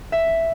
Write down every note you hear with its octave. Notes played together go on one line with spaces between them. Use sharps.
E5